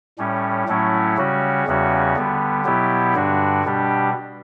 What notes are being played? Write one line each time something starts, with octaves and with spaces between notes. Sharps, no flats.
A2 G3 C#4
A2 F#3 A3 C#4 E4
C#3 G3 C#4 F#4
E2 C#3 G3 C#4 F#4
D3 G3 B3
B2 F#3 B3 E4 G4
G2 D3 G3 D4 F#4
B2 G3 D4 G4